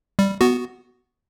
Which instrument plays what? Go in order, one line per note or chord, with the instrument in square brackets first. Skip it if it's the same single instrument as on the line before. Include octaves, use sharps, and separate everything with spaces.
[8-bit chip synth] G3
B3 F#4